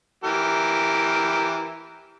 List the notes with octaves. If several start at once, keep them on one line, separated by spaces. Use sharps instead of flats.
E3 G4 A#4